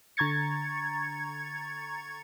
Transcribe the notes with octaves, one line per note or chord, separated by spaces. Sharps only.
D3 A#5 C#6 G#6 A6 C#7